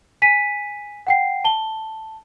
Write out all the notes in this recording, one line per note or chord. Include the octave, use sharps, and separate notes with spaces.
G#5 B6 D#7
F#5 G5 C7
A5 G7